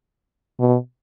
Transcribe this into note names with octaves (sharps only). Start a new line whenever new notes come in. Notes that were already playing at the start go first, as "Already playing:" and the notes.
B2